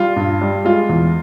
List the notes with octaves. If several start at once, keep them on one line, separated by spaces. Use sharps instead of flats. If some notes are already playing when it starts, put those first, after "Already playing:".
Already playing: G3 F4
G2
G3
G#3 F4
E2